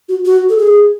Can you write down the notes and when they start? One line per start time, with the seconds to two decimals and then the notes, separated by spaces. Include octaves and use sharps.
0.09 F#4
0.25 F#4
0.49 A4
0.58 G#4